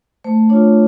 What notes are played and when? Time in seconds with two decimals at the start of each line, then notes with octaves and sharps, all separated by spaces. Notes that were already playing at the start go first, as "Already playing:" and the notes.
0.24 A3 C5
0.49 D4 F4 C#5